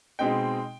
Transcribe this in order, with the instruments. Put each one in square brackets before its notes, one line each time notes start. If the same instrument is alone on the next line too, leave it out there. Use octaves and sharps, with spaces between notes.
[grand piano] B2 G#3 C4 D#4 G5